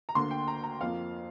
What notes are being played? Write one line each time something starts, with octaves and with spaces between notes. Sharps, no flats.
A#5
D2 D3 A#3 C6
G5
A#5
A#5
F2 F3 A#3 F5